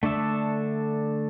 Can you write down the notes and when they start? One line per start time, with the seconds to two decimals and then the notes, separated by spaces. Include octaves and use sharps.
0.03 D3 A3 D4 A4 E5